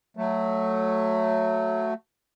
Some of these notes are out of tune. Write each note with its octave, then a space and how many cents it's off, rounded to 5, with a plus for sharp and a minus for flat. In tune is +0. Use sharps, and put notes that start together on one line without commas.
F#3 +0 A3 +10